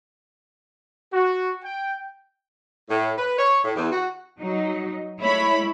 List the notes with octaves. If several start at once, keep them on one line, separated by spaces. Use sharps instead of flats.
F#4
G5
A2
B4
C#5
A2
E2
F#4
F#3 D#4
G#3 A3 E4 C#5 B5